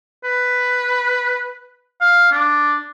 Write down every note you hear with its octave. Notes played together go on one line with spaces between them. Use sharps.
B4
F5
D4